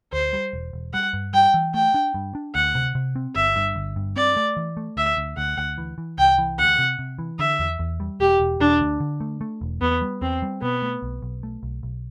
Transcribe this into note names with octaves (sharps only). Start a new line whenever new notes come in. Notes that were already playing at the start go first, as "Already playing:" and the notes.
D2 C5
G3
E1
E1
G3 F#5
G2
G3 G5
E3
A3 G5
D4
G2
D4
D2 F#5
C3
C3
C4
G1 E5
G2
G1
G2
C4 D5
A3
E3
A3
D2 E5
D2
D2 F#5
D2
E3
E3
C2 G5
E3
D2 F#5
C3
C3
E3
D3 E5
E2
E2
G3
E1 G4
E1
E1 D4
D2
D3
A3
A3
E1
E2 B3
G3
E2 C4
G3
B2 B3
A3
B1
B1
A3
B1
B1